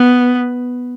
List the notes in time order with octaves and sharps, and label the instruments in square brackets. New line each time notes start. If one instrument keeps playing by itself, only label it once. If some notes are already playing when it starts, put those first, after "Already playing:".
Already playing: [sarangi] B3